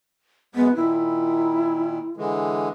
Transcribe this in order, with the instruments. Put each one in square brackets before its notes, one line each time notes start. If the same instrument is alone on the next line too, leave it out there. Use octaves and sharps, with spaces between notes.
[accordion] F#2 G#3 [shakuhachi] B3
[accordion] A#2 D#3 [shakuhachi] E4
[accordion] D3 E3 G#3